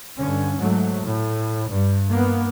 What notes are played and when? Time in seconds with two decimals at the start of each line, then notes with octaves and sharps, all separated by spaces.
0.19 G2 D3 C#4
0.59 G#2 F#3 A3
1.04 A2
1.69 G2
2.12 A#3 B3